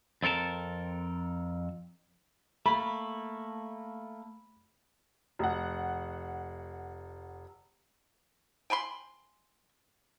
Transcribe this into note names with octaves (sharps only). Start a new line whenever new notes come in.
F2 C4 A4 A#4 A5
A3 A#3 B5
F1 F#5
G5 G#5 B5 C6